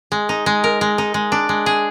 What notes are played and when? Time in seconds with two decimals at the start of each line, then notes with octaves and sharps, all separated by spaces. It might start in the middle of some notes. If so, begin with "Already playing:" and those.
0.12 G#3
0.29 D#4
0.46 G#3
0.64 A#4
0.81 G#3
0.98 D#4
1.14 G#3
1.32 D4
1.49 G#3
1.66 G#4